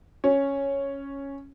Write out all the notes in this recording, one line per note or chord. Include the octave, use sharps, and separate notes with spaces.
C#4